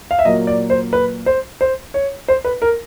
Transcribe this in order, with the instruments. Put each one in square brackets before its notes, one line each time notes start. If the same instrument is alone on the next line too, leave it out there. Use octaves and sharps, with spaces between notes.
[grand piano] F5
E5
A#2 F#3 A#3 D#5
D5
C5
B4
C5
C5
C#5
C5
B4
A#4